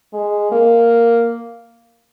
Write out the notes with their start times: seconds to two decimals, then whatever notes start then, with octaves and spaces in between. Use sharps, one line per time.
0.13 G#3
0.52 A#3